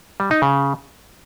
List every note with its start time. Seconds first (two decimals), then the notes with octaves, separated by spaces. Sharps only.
0.20 G3
0.31 D#4
0.42 C#3